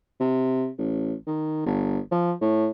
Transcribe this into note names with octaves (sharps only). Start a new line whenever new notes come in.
C3
A1
D#3
G1
F3
A2